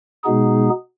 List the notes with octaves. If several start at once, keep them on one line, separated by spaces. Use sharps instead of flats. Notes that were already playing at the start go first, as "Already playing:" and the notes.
B2 G#3 B3 D#4 G#4